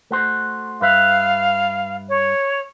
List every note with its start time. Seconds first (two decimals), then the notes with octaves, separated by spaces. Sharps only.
0.11 A3 F#4 C5
0.81 G2 B4 E5 F5
2.09 C#5